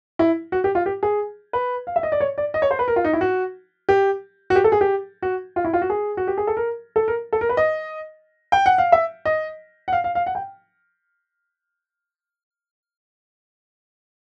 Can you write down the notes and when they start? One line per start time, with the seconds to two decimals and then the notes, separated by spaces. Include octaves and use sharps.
0.19 E4
0.52 F#4
0.64 G4
0.75 F4
0.86 G4
1.03 G#4
1.53 B4
1.87 F5
1.96 E5
2.03 D#5
2.12 D5
2.21 C#5
2.38 D5
2.54 D#5
2.62 C#5
2.71 C5
2.79 B4
2.88 A#4
2.96 F4
3.04 D#4
3.13 E4
3.21 F#4
3.89 G4
4.50 F#4
4.56 G4
4.64 A4
4.72 G#4
4.81 G4
5.22 F#4
5.56 F4
5.65 E4
5.73 F4
5.82 F#4
5.90 G#4
6.17 F#4
6.27 G4
6.38 G#4
6.47 A4
6.57 A#4
6.96 A4
7.08 A#4
7.33 A4
7.41 A#4
7.49 B4
7.57 D#5
8.52 G5
8.66 F#5
8.78 F5
8.92 E5
9.25 D#5
9.88 F#5
9.93 F5
10.04 F5
10.15 F5
10.26 F#5
10.35 G5